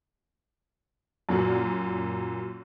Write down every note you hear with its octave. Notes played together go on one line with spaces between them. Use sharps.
F#2 A#2 F#3